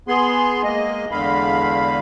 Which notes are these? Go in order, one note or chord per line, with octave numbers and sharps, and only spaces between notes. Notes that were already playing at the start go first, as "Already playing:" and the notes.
B3 G#4 C6
G#3 A#3 D#5
E2 D3 G#3 F5 B5